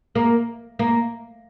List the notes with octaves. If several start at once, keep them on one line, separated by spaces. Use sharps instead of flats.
A#3
A#3